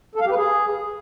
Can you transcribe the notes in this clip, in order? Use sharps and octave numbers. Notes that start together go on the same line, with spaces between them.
A4
F5
G4
B4
G#4